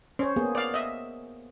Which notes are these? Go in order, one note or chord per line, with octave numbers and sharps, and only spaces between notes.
C#4 C5 C#5
A#3 B3 G#4
D5 F5
D#5 E5